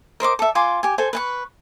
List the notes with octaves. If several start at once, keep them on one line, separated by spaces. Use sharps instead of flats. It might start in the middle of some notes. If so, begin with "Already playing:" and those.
A#4 C5 D#5 D6
A4 E5
F4 G#5 C6 D6
G4 G#5
A4 C5 G#5
B4 G#5 C#6